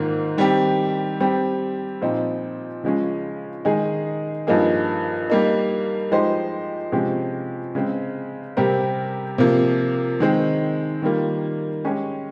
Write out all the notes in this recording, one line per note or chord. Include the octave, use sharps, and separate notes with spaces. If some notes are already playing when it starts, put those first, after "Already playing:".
Already playing: G#2 D#3 A#3 F4
D#3 G3 C4 G4
G3 C4 G4
A#2 F3 C4 D#4
C#3 F3 G#3 C#4
D#3 G#3 D#4 G#4
G2 F3 A#3 D#4 G#4
G3 A#3 D#4
F3 G#3 D#4 G4 C5
C3 F3 G#3 C#4 G4
C#3 G#3 C4
C3 G3 C4 G4 A#4
C3 F3 A#3
D#3 G#3 C4
D#3 G3 A#3 F4
G#3 C#4 G4 C#5